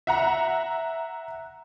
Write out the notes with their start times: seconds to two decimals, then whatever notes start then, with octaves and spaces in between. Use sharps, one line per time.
0.07 E5 F#5 A#5